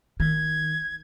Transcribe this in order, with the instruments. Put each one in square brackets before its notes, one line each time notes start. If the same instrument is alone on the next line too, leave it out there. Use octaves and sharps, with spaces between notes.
[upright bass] D#3 [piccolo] G#6